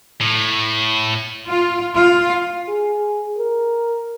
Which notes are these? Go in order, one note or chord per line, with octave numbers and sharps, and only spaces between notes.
A2
F4
F4
G#4
A#4